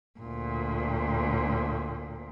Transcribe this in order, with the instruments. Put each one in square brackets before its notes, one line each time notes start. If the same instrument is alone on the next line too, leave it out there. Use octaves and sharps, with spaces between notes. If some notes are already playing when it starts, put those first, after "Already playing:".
[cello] D2 A#2